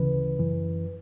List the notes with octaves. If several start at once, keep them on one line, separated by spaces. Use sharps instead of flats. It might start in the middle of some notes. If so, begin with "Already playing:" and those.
Already playing: D2 C#3 E3 B4
F#2 E3